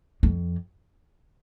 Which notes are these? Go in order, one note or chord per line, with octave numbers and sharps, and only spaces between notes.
F2